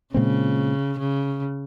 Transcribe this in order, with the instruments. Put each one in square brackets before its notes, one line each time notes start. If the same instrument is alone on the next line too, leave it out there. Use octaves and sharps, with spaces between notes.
[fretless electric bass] A#2 G#3 C4 [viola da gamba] C#3
[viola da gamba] C#3